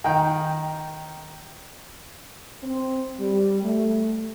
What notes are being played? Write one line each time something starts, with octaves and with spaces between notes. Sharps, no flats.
D#3 G5
C4
G3
A3